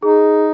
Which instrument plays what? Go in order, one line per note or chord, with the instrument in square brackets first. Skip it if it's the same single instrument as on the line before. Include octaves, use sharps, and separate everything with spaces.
[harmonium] D#4 [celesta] G#4